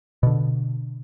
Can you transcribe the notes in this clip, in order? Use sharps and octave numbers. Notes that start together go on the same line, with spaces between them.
B2 D3